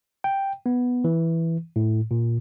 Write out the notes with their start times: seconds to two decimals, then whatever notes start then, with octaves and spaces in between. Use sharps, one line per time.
0.24 G5
0.66 B3
1.04 E3
1.76 A2
2.11 A#2